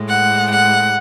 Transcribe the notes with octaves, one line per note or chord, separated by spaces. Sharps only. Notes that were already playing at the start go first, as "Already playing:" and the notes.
Already playing: A2 G#3
F#5
F#5